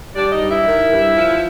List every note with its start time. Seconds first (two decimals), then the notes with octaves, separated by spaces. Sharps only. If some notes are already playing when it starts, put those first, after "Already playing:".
0.15 G3 D4 D5
0.32 D#4 D#5
0.40 G2
0.49 E4 E5
0.66 D#3
0.91 G2
1.16 F3